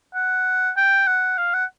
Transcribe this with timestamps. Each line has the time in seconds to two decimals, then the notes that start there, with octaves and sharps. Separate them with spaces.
0.14 F#5
0.77 G5
1.07 F#5
1.38 F5
1.54 F#5